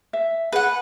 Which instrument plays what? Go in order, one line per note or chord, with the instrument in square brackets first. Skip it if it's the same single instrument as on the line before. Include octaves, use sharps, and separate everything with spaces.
[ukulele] E5
[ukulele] G#4 [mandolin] B4 F#5